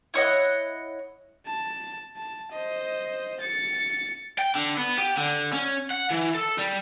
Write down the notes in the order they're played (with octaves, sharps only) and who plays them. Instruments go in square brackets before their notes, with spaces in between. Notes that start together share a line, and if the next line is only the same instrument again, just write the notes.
[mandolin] E4 C#5 D#5 F#5
[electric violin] A5
A5
C5 D#5
A6 C#7
[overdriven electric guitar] G5
D3
B3
G4
D3
C#4
F#5
E3
A4
G3